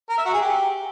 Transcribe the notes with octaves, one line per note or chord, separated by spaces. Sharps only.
A#4
E5
F#4
G#4
G4